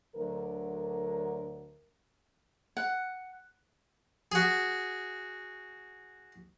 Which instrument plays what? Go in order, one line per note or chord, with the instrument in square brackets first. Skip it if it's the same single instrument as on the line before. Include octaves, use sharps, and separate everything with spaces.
[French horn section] D2 D3 F#3 A#4
[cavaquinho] F#5
[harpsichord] F#4 G#4